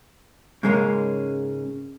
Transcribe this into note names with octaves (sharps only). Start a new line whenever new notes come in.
G#2 C#3 G#3 A#3 C#4